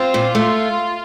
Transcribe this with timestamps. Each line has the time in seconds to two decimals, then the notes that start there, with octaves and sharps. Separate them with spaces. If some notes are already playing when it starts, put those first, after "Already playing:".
Already playing: C4 F4
0.14 A#2
0.35 A3